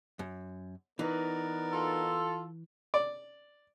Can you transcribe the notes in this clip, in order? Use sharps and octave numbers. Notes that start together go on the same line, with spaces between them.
F#2
E3 B3 D#4 A#4 B4 D5
F4 A4
D5